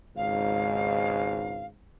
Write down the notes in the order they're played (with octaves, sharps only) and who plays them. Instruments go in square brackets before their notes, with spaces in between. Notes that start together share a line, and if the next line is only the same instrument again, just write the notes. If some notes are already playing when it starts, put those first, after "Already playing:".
[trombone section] G#1 C#2 G#2 [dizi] F5